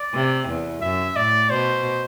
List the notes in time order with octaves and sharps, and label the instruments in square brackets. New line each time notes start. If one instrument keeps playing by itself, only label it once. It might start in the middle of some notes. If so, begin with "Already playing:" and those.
Already playing: [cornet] D5
[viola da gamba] C3
E2
[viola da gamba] F#2 [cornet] E5
[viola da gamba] A2 [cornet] D5
[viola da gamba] B2 [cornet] C5